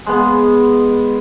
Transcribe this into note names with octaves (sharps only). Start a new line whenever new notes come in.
G#3 B3